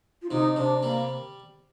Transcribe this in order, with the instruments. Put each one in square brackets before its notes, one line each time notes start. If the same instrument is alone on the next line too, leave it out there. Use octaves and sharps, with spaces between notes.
[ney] F4
[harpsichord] C3 [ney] D#4
[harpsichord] C3 [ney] D4
[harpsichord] G3 [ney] A#3